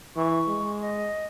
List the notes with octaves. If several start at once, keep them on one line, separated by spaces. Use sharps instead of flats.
E3 C#6
G#3
D#5